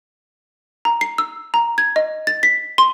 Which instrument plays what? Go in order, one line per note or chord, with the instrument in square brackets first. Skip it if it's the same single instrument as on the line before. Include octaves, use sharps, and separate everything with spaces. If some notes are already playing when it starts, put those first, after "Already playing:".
[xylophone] A#5
C7
E6
A#5
G#6
D#5
A6
B6
C6